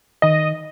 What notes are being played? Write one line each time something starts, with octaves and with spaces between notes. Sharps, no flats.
D#3 D#5